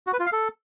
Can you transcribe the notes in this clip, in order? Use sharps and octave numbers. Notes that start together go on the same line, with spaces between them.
F#4
B4
F4
F5
A4